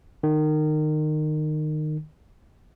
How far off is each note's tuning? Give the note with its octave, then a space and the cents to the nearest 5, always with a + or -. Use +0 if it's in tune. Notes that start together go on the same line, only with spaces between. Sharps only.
D#3 -25